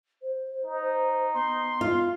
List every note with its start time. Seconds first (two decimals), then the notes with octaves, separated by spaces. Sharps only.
0.22 C5
0.64 D#4
1.34 B3 C6
1.81 F4